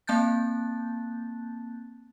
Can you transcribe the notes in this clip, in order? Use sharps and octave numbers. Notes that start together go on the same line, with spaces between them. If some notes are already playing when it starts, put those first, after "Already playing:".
A#3 C4 A5 F#6 G6 A6